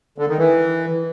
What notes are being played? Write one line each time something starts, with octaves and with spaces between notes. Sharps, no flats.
D3
D#3
E3